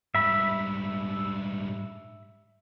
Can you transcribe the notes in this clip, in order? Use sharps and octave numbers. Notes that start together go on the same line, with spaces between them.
G#2 G3 E5 B5